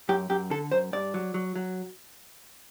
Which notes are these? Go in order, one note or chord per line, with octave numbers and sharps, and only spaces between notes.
F#2 G4
F#2 G4
D3 A4
F#2 C5
G2 D5
F#3
F#3
F#3